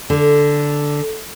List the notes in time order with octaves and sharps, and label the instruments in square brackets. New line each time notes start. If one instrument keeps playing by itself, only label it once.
[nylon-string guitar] D3